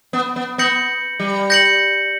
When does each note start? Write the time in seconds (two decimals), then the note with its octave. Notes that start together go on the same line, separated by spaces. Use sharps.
0.13 B3
0.36 B3
0.58 B3 G6 A#6 C#7 F#7
1.20 G3
1.50 G6 A#6 C#7 F#7